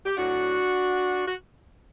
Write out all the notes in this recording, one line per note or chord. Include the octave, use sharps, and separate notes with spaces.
G4
A2 F#3 D4 F#4
F#4